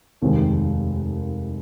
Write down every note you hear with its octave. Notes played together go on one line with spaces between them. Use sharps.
F1 D#2 D#3 G#3 C4